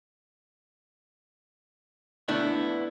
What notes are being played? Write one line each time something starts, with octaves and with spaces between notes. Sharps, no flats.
A3 B3 D4 E4